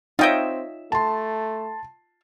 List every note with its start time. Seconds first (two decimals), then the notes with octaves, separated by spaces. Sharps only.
0.19 C4 D#4 F4 C#5 D#5 E5 G5
0.92 A3 A5 C6